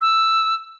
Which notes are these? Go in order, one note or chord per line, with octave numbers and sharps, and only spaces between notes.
E6